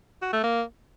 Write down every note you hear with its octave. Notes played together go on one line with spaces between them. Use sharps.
F#4
A3
A#3